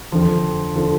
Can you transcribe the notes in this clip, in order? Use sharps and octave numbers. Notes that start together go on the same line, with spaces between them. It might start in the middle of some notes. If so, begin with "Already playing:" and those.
F2 D3 F3
D3 F3